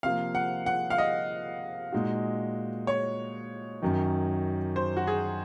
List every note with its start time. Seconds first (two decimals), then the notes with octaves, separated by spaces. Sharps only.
0.03 C3 F3 A#3 F5
0.35 F#5
0.66 F#5
0.90 F5
0.98 D#5
1.92 A#2 G#3 D#4 F#4
2.87 C#5
3.82 F#2 D#3 F#3
4.76 C5
4.97 F#4
5.07 G#4